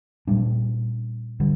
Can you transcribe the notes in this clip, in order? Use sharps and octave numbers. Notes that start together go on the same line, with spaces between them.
A#2 G3 D4
D3 G3